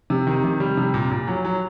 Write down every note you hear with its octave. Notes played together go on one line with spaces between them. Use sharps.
C3
D#3
C3
G3
C3
A#2
A#2
F#3
F#3